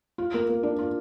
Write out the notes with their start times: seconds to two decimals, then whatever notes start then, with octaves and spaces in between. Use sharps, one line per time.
0.18 F4
0.34 A#3
0.49 A#3
0.63 D4
0.79 F4